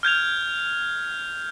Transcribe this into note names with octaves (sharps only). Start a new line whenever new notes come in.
F6 G6 G#6 F7